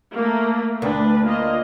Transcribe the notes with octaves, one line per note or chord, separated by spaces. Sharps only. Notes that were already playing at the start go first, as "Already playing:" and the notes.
A3 A#3
D2 D4 B4
A#3 F4 D#5